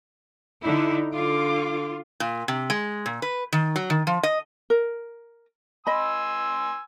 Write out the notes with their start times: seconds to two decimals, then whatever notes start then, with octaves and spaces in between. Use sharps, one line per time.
0.64 D3 D#4 E4
1.14 D3 F4 D6
2.20 A#2
2.48 C3
2.70 G#3
3.06 A#2
3.22 B4
3.53 D#3
3.76 F#3
3.90 D#3
4.07 F3
4.23 D#5
4.70 A#4
5.87 D#5 G#5 B5 C6 E6